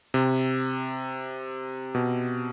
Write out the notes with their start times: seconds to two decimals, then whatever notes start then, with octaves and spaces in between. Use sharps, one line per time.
0.14 C3
1.95 B2